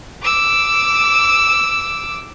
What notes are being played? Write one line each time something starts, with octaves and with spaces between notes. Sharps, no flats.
D6 E6